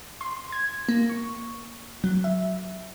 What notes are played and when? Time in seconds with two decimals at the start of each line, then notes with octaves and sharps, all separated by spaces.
0.21 C6
0.52 G#6
0.89 A#3
1.09 C#6
2.04 F#3
2.24 E5